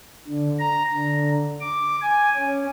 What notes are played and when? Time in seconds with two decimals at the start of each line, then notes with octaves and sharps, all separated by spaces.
0.28 D3
0.59 A#5
0.93 D3
1.60 D6
2.02 G#5
2.36 C#4